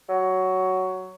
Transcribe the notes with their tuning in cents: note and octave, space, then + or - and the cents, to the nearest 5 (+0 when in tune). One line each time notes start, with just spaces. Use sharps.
F#3 +10